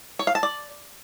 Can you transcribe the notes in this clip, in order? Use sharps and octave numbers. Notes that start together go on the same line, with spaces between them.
C#5
F5
A5
D5